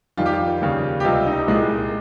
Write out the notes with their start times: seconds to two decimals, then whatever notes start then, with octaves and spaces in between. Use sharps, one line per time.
0.17 F2 D#3 G3 F4
0.26 G4
0.33 F4
0.61 D#2 C#3 G3
1.00 G4
1.04 C#2 C3 G3 F4
1.26 D#4
1.48 C2 A#2 G#3